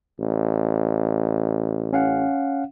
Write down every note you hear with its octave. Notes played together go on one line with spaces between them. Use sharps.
A1
C#4 F5 F#5